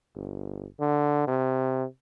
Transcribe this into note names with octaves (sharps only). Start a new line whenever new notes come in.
G1
D3
C3